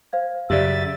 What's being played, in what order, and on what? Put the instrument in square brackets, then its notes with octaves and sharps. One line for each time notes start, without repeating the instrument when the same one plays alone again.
[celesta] C5 F5 G#6
[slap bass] F#2 C#3 [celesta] G4 D5 [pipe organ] E5 A6